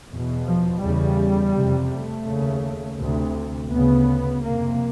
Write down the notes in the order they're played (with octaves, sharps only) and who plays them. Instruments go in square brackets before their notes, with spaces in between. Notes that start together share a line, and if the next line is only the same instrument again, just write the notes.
[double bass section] E2 B2
F3
E2 C#3 G3
F2 C3
A3
D#2 C#3
D2
C3
D2 C#3 B3
F2 C3 A#3